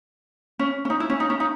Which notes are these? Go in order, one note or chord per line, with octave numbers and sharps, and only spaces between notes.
C#4
C#4
D#4
E4
C#4
D#4
C#4
D#4